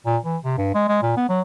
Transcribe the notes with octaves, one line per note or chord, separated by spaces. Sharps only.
A#2
E3
C3
G2
G#3
G#3
A#2
B3
F#3